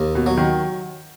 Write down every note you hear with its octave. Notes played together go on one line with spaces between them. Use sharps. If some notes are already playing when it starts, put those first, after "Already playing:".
Already playing: D#2
B2
F#3
D#3